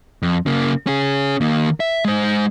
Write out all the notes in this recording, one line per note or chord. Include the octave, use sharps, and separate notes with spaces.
F2
C#3 A#3
C#4 G#4
D#3 A#3
E5
G#3 C5